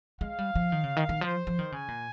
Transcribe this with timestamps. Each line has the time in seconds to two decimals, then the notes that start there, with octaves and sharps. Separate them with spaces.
0.21 G#3 F5
0.39 G3
0.55 F3
0.72 D#3
0.84 C#3
0.97 D#3
1.09 D#3
1.21 F3 C5
1.47 F3
1.59 D#3
1.72 C#3 G#5
1.88 A#2